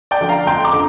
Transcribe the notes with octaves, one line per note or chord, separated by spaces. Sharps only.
D5 G5
D3 F3
F5 A#5
F2 G5 C6
A#5 D6
D3